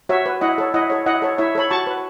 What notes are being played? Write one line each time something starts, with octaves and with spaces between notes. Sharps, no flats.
F#4 C#5 E5
B4
E4 D#5 F#5
A4 C#5
E4 D#5 F#5
A4 C#5
E4 D#5 F#5
A4 C#5
E4 C#5 E5
A4 C#5 B5
F#4 A5 C#6
B4